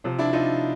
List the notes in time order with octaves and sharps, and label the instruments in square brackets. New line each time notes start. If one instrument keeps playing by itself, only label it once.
[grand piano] C3 F3
D4 E4
D#4 F4